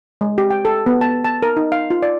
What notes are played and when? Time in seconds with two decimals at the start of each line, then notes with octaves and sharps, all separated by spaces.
0.21 G#3
0.38 G4
0.50 G5
0.65 A4
0.86 B3
1.01 A5
1.25 A5
1.42 A#4
1.57 D#4
1.72 F5
1.90 F4
2.02 D5